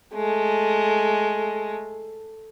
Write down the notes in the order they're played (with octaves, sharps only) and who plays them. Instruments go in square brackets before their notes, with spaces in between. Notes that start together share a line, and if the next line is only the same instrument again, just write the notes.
[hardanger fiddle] G#3 A3